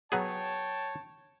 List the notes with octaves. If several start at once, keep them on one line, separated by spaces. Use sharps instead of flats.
F#3 B3 G#4 C#5 G5 A5